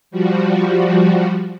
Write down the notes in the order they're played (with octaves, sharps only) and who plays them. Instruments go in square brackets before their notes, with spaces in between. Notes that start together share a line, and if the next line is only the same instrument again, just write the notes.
[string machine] F3 G3 F#4